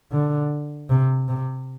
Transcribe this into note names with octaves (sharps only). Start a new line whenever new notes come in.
D3
C3
C3